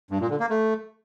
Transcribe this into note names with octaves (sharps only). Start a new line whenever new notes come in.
G2
A#2
D3
A#3
A3